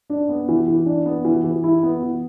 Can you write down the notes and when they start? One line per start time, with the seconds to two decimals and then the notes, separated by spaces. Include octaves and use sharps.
0.10 D4
0.29 B3
0.48 E3
0.68 E3
0.86 D4
1.06 B3
1.25 E3
1.44 E3
1.64 E4
1.83 B3
2.03 E3